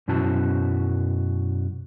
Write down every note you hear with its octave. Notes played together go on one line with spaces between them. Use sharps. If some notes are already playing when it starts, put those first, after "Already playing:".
F#2 B2 C#4 E4 F#4 A5